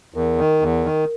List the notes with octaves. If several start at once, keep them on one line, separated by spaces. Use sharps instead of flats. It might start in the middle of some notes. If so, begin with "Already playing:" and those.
E2 A#4
D#3
E2
D#3